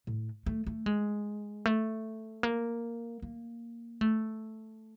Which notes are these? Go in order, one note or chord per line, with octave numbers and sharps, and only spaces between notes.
A2
A3
A3
G#3
A3
A#3
A#3
A3